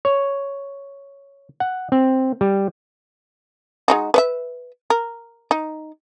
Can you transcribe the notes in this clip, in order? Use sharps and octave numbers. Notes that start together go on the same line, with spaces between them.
C#5
F#5
C4
G3
G#3 D#4 F#4
B4 C#5 E5
A#4
D#4